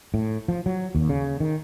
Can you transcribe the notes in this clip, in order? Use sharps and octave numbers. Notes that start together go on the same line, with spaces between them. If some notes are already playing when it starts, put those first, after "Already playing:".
A2
F3
F#3
D#2
C#3
D#3